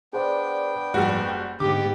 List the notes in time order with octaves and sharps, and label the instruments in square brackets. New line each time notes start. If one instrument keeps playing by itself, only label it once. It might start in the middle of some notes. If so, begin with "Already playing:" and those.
[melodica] B3 D4 G5 [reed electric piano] G#4 C5 D5
[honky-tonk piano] F#1 G3 F#4 [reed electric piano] G#2 F3
[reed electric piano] G6
[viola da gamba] G#2 B3 G4 [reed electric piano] D3 [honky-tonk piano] D6